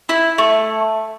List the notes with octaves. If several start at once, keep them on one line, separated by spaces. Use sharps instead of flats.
E4
A3